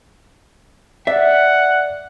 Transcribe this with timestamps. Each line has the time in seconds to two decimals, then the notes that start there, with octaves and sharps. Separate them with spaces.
1.07 D5 E5 F#5